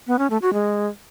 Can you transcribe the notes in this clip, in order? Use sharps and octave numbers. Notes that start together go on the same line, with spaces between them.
B3
C#4
A3
F#4
G#3